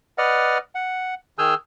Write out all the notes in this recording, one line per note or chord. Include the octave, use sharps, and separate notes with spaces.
B4 D5 D#5 F#5 F6
F#5
D#3 G#4 G#5 E6 F6 G6